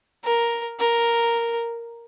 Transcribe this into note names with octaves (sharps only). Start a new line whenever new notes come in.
A#4
A#4